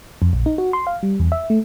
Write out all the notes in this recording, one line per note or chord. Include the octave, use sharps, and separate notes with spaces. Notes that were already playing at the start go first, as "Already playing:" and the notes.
F2
A#1
D#4
F#4
C6
F5
G3
E2
E5
A3